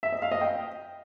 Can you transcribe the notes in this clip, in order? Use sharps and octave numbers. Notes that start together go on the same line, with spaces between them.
E5
D#5
F5
D#5
G5